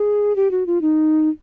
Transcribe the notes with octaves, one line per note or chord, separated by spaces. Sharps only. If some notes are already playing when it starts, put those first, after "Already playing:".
Already playing: G#4
G4
F#4
F4
D#4